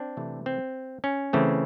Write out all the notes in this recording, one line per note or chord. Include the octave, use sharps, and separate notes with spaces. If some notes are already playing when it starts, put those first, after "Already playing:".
Already playing: C4 D4
C3 E3 A3
C4
C#4
C#3 E3 A3 C4